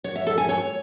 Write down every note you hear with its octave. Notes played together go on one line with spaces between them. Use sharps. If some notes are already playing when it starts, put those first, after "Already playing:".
C#5
E5
A4
G#5
C#5